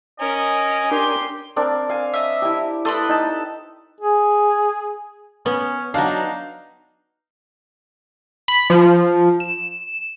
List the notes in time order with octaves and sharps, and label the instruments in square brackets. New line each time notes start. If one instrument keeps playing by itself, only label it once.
[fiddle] C#4 A#4 [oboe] D#5 [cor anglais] G#5
[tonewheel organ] D4 A#4 [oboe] G4 [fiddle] C6
[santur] C4 D4 A#4
F5 G#5
[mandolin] D#5 E5
[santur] E4 G4
[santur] E4 A4 [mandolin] B4 C6 D#6
[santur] D#4 A5
[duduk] G#4
[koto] B3 [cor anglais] C#4
[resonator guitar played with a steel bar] F#3 D4 [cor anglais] D#4 [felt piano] F5
[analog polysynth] B5
F3
E7